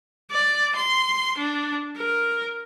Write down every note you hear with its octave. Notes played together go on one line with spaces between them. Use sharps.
D5
C6
D4
A#4